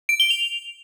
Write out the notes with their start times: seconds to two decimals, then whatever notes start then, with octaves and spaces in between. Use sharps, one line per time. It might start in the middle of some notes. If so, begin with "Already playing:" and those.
0.09 D7
0.20 G7
0.30 F7